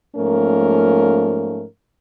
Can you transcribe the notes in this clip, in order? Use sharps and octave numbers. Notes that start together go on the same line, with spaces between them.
G#2 F3 A3 A#3 C#4 A#4